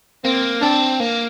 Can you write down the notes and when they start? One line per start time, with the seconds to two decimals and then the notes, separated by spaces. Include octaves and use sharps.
0.25 A#3 C4
0.62 C4 D4
1.00 A#3